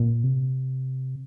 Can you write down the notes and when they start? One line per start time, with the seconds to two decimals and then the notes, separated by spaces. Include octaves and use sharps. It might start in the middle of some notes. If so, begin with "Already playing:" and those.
Already playing: A#2
0.24 C3